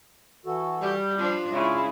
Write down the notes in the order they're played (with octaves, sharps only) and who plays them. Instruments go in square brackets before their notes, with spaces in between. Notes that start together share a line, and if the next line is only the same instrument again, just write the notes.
[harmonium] E3 F#4 A4
[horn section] G3 [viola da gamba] G4
[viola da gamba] F3 D4 [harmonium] F4
[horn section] C#3 [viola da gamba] G#3 [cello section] E4